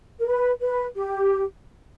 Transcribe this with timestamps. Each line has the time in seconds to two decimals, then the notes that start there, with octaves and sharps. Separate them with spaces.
0.19 A#4
0.27 B4
0.61 B4
0.95 G4